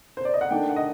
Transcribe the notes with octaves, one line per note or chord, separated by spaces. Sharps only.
C5
D5
D#5
F#5
D#3 A3 D4 G5
F#5
D#5